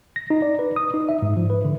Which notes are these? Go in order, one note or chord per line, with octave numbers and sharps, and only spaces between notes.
A#6
D#4
D5
B4
D#6
D#4
E5
G#2
F3
B4
D3